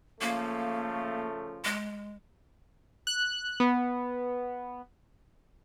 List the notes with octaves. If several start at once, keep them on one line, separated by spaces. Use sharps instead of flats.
C#3 F3 A3 A#3
G#3
F#6
B3